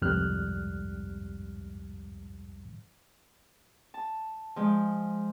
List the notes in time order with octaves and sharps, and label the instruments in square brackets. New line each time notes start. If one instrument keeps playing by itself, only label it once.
[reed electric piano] C2 F2 G#2 G3 F6 F#6
[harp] A5
F3 G#3